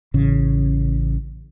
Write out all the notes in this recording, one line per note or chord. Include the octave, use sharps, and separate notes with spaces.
A1 C#3